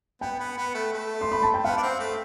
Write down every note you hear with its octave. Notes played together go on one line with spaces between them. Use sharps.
B3 G5
B3
B3
A3
A3
C6
B5
A5
G5
B3 F5
D4
C4
A3